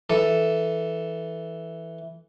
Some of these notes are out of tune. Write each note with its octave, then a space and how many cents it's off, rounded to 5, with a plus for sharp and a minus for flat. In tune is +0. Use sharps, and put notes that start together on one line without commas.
E3 +0 A4 +0